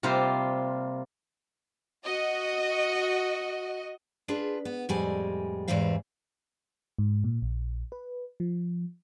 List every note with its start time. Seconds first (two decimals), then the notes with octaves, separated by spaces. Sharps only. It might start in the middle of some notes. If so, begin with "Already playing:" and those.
0.03 C3 G3 A#3 F4 C5
2.05 F#4 D#5
4.28 D4 F4 G#4 B4
4.65 B3
4.89 F2 A2 G3 G#3 G#5
5.68 E2 G#2 E3 G3 C4 F5
6.99 G#2
7.24 A#2
7.42 A#1
7.92 B4
8.40 F3